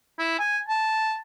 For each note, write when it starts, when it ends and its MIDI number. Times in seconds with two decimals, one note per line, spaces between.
0.19 0.35 64
0.39 0.59 80
0.68 1.17 81